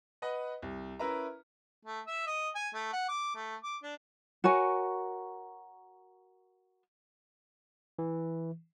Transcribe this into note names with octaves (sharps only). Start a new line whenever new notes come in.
B4 D#5 F#5
C2
C#4 E4 A#4 B4 E5 A#5
A3
E5
D#5
G#5
A3
F#5
D6
A3
D6
D4
F#4 A#4 C#5 G#5
E3